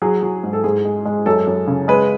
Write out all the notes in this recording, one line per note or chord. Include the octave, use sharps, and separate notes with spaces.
F#3 G#4
F#3
G#2
A4
G#2 G#4
G#3
G#3
F#2 A4
F#2
C#3
G#3 B4